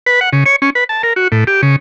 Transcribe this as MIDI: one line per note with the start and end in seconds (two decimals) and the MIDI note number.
0.06 0.20 71
0.21 0.30 78
0.33 0.44 49
0.46 0.56 73
0.62 0.70 61
0.75 0.84 71
0.89 1.02 81
1.03 1.13 70
1.16 1.28 66
1.32 1.44 45
1.47 1.61 67
1.62 1.76 49